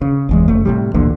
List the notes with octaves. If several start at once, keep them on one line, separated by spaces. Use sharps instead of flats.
C#3
G1 E2 G#3
F#1 A3
A2 C3 G3
A1 D2 A#2 D3